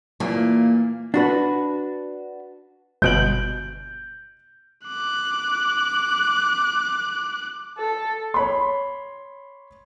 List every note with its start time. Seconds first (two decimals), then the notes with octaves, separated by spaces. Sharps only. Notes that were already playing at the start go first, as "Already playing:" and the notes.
0.20 A#2 E3 A#3
1.14 D4 F#4 B4
3.02 G1 B2 G6 D7 F#7
4.87 D6 F#6
7.78 A4
8.34 C#5 B5 C6